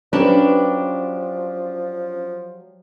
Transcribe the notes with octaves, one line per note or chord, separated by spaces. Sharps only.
F3 F#3 C#4 D4 G4 B4